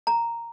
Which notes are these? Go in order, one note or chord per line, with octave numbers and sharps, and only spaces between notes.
A#5